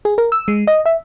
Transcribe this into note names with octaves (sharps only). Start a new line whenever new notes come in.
G#4
A#4
E6
G#3
D#5
E5